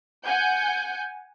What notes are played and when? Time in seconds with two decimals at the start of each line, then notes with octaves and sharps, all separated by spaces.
0.23 F#5 G#5 G6